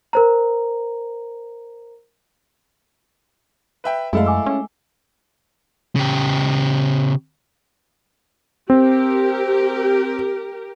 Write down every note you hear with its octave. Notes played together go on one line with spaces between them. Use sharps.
A#4 C5 A#5
B4 E5 G5
F#2 G#3 A3 E4 A4 F5
G#5 D6 E6
C#4
C#3 G4
C4 G4 A#4